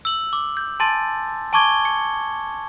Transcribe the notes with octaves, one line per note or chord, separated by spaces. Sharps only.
E6 F#7
D6
G6
G#5 A5 C6 A6
G#5 A5 C#6 D6 G#6 G7
C#7